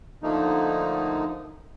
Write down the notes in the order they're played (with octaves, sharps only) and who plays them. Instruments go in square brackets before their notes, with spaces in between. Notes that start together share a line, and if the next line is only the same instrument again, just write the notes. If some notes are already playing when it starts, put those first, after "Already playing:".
[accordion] D3 F3 A3 A#3 D#4